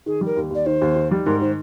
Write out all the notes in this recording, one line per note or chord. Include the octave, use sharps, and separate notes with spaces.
D#3 G#4
G3 A#4
D#2
D#2 D5
D#3 C5
D#2
D#3
G3
G#2 A#4
D#3 C5